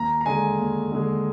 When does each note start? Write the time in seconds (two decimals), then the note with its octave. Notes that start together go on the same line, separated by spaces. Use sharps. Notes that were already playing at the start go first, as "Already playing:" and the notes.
Already playing: D#2 A#5
0.21 A#5
0.26 D3 G#3 G#5
0.59 D#2
0.92 D3 G#3